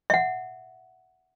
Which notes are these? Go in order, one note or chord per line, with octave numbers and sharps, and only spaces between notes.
E5 F#5